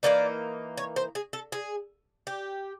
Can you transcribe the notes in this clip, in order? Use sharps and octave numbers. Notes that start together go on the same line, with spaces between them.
E3 G3 A#3 D#4 D5
C#5
C5
G#4
A4
G#4
G4